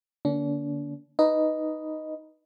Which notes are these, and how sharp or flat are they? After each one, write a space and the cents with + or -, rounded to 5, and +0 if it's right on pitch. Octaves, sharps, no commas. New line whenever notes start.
D3 +0 A#3 +10 D4 -40
D#4 +0 B4 -5 D#5 +0